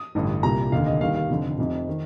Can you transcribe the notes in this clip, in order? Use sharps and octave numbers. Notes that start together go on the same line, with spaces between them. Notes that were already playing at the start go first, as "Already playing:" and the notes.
Already playing: D#6
A1 G2 D3
C2 A#2 G3 A#5
F1 D#2 D3 F5
D#5
D#2 D#3 G3 F5
F5
F1 F2 D3
F1 F2 C3
D#3